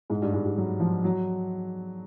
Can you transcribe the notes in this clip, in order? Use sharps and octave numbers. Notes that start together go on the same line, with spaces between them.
G#2 G#3
G2 G3
G#2 G#3
G2 G3
F#3
F3
F#3